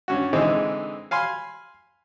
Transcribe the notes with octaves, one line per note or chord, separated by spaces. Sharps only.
G2 C#4 F#4
D3 E3 G#3 C4 D#4 G#4
F5 G#5 B5 C6